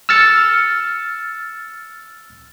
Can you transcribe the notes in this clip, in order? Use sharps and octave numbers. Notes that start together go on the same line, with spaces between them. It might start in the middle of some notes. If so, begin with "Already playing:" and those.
E6 F6 A6 C#7